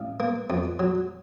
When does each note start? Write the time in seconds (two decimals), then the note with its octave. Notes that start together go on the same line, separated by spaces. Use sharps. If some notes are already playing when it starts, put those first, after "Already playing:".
Already playing: A1 F5
0.20 A#3
0.50 F2
0.79 F#3